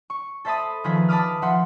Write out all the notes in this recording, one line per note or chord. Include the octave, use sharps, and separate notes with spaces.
C#6
A4 C5 E5 A5 B5 D#6
D#3 F3 G#4 B4 E5
A5 B5 D6 D#6 F6
F3 E5 F#5 C6